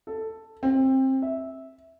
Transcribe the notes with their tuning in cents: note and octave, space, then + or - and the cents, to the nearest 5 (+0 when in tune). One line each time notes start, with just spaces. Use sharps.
A4 +5
C4 +20
E5 -10